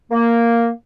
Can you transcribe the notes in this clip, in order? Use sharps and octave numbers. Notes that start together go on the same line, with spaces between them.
A#3